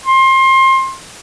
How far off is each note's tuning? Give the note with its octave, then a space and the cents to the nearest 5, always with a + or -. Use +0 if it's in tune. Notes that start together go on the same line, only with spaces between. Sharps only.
C6 +25